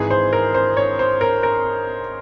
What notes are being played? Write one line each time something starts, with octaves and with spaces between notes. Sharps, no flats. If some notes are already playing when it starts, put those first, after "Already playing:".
Already playing: G#1 G#2 E3 G#4
C5
A#4
C5
C#5
C5
A#4
A#4